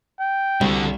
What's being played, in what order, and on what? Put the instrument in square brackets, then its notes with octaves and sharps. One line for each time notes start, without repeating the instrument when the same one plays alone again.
[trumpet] G5
[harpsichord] C2 [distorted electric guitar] D3 F#4